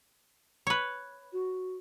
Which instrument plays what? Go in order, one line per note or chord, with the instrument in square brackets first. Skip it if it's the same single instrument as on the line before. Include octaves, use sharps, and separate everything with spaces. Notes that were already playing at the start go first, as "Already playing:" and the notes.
[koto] B4 C#5
[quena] F#4